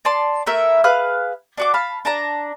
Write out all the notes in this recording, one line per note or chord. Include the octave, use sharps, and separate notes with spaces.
D5 A5 C6
A3 E4 A#4 E5
G#4 B4 F5 F#6
D4 F#4 D6
F5 A5 B5
D4 A5 A#5